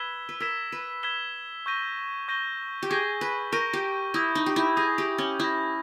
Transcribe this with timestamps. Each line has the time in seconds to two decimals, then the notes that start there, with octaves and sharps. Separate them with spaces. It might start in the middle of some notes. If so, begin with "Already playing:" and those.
Already playing: B4 E6 G#6 B6 E7 G7
0.29 B4
0.40 A#4 E6 G#6 B6 E7 G7
0.72 B4
1.03 E6 G#6 B6 E7 G7
1.66 C#6 G6 A#6 D#7 G7
2.28 C#6 G6 A#6 D#7 G7
2.83 G4
2.90 G#4 C#6 G6 A#6 D#7 G7
3.21 B4
3.52 A#4 C#6 G6 A#6 D#7 G7
3.73 G4
4.14 E4 D#6 G6 A#6
4.35 D#4
4.46 G4
4.56 E4
4.76 G#4 D#6 G6 A#6
4.98 G4
5.18 C#4
5.39 E4 D#6 G6 A#6